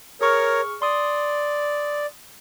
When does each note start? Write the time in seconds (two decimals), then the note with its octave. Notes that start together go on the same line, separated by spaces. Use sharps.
0.21 G#4 A#4 C#5 C#6 F6
0.82 D5 C6 D#6